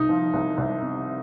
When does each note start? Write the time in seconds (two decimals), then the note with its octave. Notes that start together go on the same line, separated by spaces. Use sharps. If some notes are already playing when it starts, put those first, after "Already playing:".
Already playing: C2 D#4
0.09 F3
0.34 C2
0.58 C2
0.82 C3